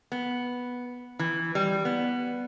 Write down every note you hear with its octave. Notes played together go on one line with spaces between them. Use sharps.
B3
E3
G3
B3